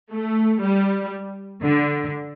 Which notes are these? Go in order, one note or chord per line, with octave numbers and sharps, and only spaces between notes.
A3
G3
D3